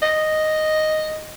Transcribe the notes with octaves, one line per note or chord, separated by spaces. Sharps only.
D#5